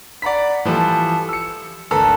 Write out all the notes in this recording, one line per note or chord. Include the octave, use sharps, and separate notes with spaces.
D5 F#5 A#5 B5 B6
E3 F3 G3 A4
E6 C#7
G#1 D2 A4 B4 A#5 E6